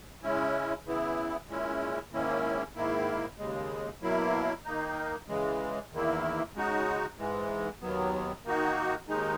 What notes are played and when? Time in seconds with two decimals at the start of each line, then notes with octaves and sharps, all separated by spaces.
0.23 C#3 G#3 C#4 E4
0.86 C#3 E3 B3 E4
1.49 A#2 G#3 C#4 E4
2.13 G#2 D#3 A#3 C#4 E4
2.75 G#2 D#3 A#3 E4
3.38 D#2 C#3 G#3
4.02 B2 F#3 A#3 E4
4.65 D#3 A#3 D#4
5.28 C#3 E3 G#3
5.92 E2 D#3 A#3 E4
6.55 C#3 G#3 D#4 F#4
7.18 G#2 E3 G#3
7.81 D#2 D#3 F#3 B3
8.45 D#3 A#3 D#4 F#4
9.08 D#2 D#3 G#3 D#4